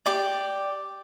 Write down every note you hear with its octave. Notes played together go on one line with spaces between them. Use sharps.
G4 D5 D6